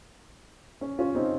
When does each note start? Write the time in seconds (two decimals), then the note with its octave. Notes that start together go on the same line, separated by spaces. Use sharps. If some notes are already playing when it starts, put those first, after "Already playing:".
0.81 C#4
0.99 C#4 F4
1.15 C4 D#4